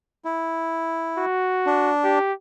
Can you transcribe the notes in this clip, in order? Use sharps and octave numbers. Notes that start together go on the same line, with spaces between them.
E4
F#4
D4
G4